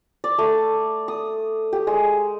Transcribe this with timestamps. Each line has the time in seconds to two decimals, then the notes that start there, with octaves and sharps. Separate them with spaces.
0.24 D5
0.39 A3
1.08 D#6
1.73 G4
1.87 G#3